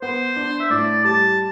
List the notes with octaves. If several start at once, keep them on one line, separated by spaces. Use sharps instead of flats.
B3 C5
D4
E5
A2 D5
G3 A5